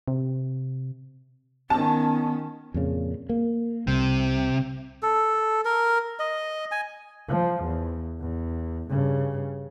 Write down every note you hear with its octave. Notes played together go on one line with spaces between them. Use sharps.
C3
D#3 B3 C#4 A5
F2 A#2 C#3
A#3
C2 C3
A4
A#4
D#5
G#5
F3
E2
E2
G2 C#3